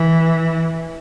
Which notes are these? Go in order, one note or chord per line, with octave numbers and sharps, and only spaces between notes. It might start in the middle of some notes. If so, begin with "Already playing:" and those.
Already playing: E3